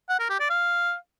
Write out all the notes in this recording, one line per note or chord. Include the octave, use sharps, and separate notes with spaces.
F#5
A#4
G4
D5
F5